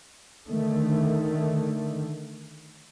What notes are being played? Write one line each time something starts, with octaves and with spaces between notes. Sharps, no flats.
D3 D#3 A3